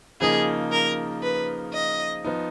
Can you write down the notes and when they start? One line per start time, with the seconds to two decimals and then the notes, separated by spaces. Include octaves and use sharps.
0.20 C#3 F3 A#3 D#4 G#4
0.72 A#4
1.23 B4
1.74 D#5
2.25 F3 B3 D#4